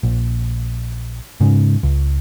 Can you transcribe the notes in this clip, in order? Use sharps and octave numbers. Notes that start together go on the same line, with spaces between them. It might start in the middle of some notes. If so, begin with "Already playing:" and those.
A#1
G#2 C#3
C#2